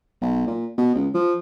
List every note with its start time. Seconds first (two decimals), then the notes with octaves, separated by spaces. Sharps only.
0.22 B1
0.47 A#2
0.78 B2
0.95 C#2
1.14 F3